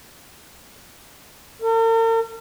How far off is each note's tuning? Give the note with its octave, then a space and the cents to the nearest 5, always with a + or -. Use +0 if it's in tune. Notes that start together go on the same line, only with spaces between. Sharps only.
A#4 -45